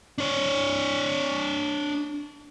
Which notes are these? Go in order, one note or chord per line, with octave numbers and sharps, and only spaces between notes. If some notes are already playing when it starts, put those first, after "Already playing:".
D4 C#5